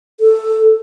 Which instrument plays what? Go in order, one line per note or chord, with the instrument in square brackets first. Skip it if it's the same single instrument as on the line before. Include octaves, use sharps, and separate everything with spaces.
[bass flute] A4